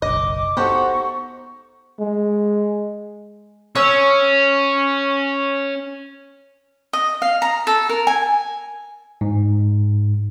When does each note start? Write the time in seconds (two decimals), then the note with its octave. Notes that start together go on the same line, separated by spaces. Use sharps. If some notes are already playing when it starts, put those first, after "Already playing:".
0.02 F#1 B1 D#5 D6
0.57 B3 D#4 F#4 G4 A4 C5 F#5 C#6
2.00 G#3
3.75 C#4 C#5 E6
6.93 D#5
7.22 F5
7.42 A#5
7.67 A4
7.89 A#4
8.07 G#5
9.21 G#2